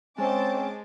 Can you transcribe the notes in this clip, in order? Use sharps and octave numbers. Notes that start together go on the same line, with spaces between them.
G#3 C4 C#4 C5 A5 D6